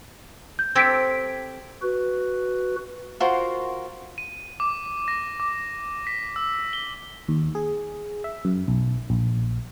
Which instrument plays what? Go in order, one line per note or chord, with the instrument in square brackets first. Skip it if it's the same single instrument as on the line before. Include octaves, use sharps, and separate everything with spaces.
[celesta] G6
[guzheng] C4 G4 A4 [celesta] G#6 B6 D7
[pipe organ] F#4 B4
[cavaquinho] F4 F#4 A#4 C5
[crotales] D#7
D6
A#6
D6
B6
E6
G7
[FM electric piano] D#2
G#4
E5
F#2
B1
A#1